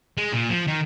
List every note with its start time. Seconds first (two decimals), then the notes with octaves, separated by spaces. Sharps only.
0.17 G#3
0.32 A#2
0.50 F3
0.67 D#3